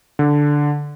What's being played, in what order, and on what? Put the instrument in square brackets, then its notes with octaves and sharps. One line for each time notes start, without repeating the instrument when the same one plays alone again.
[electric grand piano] D3